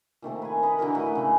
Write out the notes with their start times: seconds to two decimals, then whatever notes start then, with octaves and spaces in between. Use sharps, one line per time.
0.22 A#2 D#3 A3 C4
0.42 B4 G#5
0.62 B4 D#5 F#5 B5
0.79 D3 E3 F#3 A#4
0.95 A2 F#4 B4 F#5
1.15 C#3 G#3